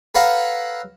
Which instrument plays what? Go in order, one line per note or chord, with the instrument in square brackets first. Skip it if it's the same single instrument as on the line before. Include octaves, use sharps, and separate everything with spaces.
[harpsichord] A4 B4 C#5 F5 F#5 A#5